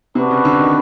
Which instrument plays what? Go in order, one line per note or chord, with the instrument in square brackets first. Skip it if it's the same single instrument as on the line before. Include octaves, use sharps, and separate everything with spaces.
[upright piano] C3 [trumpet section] D4 F#4 B4
[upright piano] C#3
D3
D#3